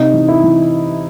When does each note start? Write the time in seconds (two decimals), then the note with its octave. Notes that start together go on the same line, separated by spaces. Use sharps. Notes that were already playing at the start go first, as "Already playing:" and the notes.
Already playing: C3 D#4
0.14 E3
0.28 E4
0.43 E3